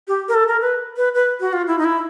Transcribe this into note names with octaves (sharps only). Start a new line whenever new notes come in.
G4
A#4
A4
A#4
B4
B4
B4
F#4
F4
E4
D#4
E4